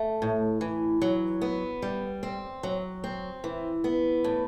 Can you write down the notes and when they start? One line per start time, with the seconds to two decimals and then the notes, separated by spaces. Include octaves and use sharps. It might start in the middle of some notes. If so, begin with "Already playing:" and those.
Already playing: A3
0.22 A2
0.61 E3
1.02 F#3
1.41 B3
1.82 G3
2.23 C4
2.63 F#3
3.04 C4
3.44 E3
3.84 B3
4.24 A2